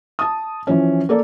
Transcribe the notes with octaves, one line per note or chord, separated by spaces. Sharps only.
A5 D#6
E3 F3 C#4
A#3 A4 D5